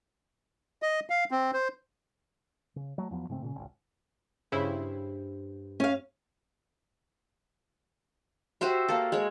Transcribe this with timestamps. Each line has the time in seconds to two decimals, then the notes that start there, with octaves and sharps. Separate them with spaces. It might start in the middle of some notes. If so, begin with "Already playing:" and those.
0.82 D#5
1.10 F5
1.31 C4
1.53 C5
2.76 C#3
2.98 F#3 A3
3.11 E2 F3 F#3 B3
3.29 G#2 C#3 A3 C4
3.42 A#2 C#3 C#4
3.56 G#1 C#2
4.52 G2 C#3 E4 C5
5.80 C#4 F5
8.61 F#4 G4 C5 E5
8.89 A#3 A4
9.12 G#3 C#5